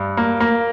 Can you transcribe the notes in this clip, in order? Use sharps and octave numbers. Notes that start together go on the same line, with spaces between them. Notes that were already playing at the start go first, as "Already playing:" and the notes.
Already playing: G2
A#3
A#3